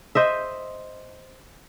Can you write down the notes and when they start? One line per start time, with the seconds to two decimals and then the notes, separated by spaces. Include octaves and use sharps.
0.15 C5 D#5 E5